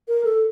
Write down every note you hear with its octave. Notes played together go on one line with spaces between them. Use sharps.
A#4
A4